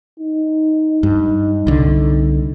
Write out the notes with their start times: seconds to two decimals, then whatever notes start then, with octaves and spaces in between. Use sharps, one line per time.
0.20 D#4
1.03 G2
1.67 C2 D3